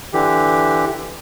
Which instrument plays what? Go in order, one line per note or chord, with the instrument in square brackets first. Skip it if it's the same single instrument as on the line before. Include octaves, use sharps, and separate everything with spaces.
[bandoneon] D3 E3 G4